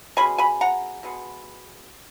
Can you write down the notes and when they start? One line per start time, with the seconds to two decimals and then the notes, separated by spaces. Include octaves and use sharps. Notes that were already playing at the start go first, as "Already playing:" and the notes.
0.17 B2 G#3 C#4 G#5 B5
0.38 G#5 B5
0.61 F#5 A#5
1.03 B2 G#3 B3